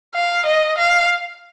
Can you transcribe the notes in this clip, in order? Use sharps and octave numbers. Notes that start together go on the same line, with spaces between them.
F5
D#5
F5